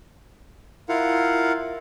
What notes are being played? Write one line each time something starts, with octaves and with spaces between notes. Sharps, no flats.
E4 F4 A#4 F5 F#5